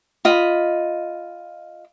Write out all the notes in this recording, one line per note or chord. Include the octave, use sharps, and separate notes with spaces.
F4 D#5 B5